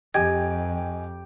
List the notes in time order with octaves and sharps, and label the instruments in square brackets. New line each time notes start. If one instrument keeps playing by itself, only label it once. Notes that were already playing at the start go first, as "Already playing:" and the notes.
[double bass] F2 [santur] G4 G5 [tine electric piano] D#5 G#5 [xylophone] G#6